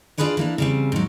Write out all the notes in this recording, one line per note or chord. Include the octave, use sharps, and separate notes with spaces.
D4 F4 G#4 B4 C#5 D#5
E3 A#3 D4
C#3 G3 C4
G#2 F#3